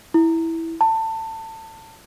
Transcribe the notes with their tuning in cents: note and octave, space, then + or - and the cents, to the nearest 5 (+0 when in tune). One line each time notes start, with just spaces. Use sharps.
E4 -5
A5 +25